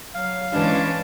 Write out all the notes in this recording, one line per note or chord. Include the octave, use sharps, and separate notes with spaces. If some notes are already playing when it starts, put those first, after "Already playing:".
F#3 F5
G2 E3 G#3 C#4 D4